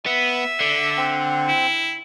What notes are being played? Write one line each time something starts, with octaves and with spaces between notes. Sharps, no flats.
B3 E5
D3
C4
E4